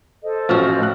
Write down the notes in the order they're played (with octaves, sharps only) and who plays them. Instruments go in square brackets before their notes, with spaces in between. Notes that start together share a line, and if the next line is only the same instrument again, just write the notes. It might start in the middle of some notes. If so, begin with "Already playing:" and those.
[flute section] A4 C5 D#5
[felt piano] A1 F6 [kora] F3 F#4
[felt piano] A2 F#6